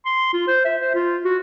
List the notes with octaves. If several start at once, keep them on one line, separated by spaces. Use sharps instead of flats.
C6
F4
C5
E5
C5
F4
F#4